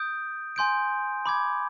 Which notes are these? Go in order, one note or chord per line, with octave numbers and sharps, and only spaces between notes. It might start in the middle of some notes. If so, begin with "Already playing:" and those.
Already playing: D#6 G6 D7
G#5 C6 G6 D7
B5 D6 G#6